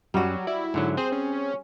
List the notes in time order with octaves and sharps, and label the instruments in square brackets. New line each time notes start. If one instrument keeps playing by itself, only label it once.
[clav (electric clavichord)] F#2 [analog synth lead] F#3 [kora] G3 F#4
[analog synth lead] E4 [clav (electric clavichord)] D5
[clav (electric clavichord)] G#2 D3 F#3
[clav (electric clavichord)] C4 G#4 [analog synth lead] C5
[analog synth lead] C#4